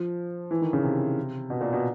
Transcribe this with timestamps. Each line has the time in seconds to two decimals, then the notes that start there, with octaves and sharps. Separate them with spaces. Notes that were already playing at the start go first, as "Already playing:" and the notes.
Already playing: F3
0.51 E3
0.62 D#3
0.73 C#3
0.84 C3
1.50 B2
1.61 A#2
1.73 B2